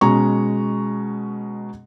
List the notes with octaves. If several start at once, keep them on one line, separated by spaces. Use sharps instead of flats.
B2 G#3 C#4 A#5 C#6